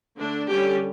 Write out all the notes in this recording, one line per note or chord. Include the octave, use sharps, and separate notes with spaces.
D3 A3 D4
D3 G3 C#4 G4